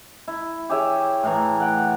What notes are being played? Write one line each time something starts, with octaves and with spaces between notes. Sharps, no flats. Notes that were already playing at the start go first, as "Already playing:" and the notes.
E4
G4 G#4 C#5 E5
A2 E3 A#5
F#5 G5